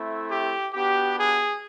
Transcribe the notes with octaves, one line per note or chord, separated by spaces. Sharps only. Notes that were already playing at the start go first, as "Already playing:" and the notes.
Already playing: A3 C4 E4
G4
B3 D4 F#4 G4
G#4